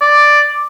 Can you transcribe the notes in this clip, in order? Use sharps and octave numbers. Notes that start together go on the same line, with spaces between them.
D5